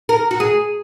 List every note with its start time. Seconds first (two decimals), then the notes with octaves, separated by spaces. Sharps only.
0.09 A#4
0.31 F#4
0.40 G#4